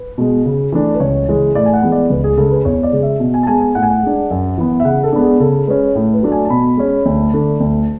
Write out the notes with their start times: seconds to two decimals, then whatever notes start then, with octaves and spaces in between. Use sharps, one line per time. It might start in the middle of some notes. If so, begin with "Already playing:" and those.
Already playing: B4
0.18 B2 G#3
0.46 C#3
0.72 E3 A3 D4
0.94 B4
1.00 C#2 C#5
1.28 C#3 E3 G#3
1.55 A2 D5
1.66 G#5
1.73 F#5
1.82 E3 G#3 B3
1.92 D5
2.10 C#2 B4
2.24 G#4
2.37 C#3 G#3 A4
2.51 B4
2.65 E2 C#5
2.83 D5
2.93 C#3 G#3
3.02 E5
3.20 B2
3.34 G#5
3.43 A5
3.47 G#3 B3 G#5
3.61 G#5
3.75 A2 F#5
3.83 G#5
3.90 F#5
4.03 G#3 D4
4.31 F#2
4.58 E3 B3
4.80 E5
4.85 C#3 F#5
5.03 A4
5.13 G#3 B3 D4
5.22 G#4
5.40 C#3 A4
5.67 G#3 C#4 B4
5.95 A2
6.13 B4
6.22 F#3 A3 D4
6.32 G#5
6.45 A5
6.50 B2 B5
6.77 G#3 C#4
7.06 D2
7.33 D3 A3 D4
7.60 D2